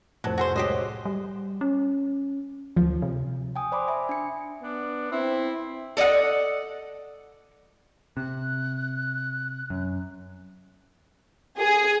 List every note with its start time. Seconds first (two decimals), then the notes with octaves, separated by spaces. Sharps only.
0.24 C2 F2 A2 F#3 C5 A5 F#6
0.38 F#4 G#4 C5 E6
0.56 G#3 F#4 G4 C5 C#5 D#5
1.05 G3
1.61 C#4
2.76 D2 F3
3.02 C3
3.56 G5 G#5 D#6
3.72 C5 D5 B5 C6 D6
3.88 E5 G#5 B5
4.09 D4 C#7
4.62 B3 D4
5.11 C4 E4
5.97 A4 D5 D#5 F#5
8.17 C3 F#6
9.70 F#2
11.59 G#4